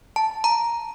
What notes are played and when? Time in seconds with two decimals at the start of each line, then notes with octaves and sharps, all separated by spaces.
0.16 A5
0.44 A#5